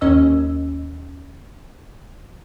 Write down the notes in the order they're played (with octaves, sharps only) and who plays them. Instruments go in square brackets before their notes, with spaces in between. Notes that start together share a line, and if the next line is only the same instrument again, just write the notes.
[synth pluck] D#2 C#4 D#5 E6